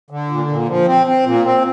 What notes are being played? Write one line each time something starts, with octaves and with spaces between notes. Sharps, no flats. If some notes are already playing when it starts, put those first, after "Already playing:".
D3
A#2
A#2
F3
C4
C4
A#2
C4